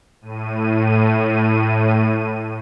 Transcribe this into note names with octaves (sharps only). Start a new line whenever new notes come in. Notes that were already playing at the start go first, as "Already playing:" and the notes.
A2 D#7